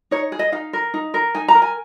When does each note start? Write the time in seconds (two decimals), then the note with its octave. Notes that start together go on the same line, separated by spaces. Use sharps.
0.11 D#4 C#5
0.32 G#4
0.39 D#5
0.52 D#4 F5
0.73 A#4
0.94 D#4
1.14 A#4
1.35 D#4 G#5
1.48 A#5
1.54 A#4
1.62 G#5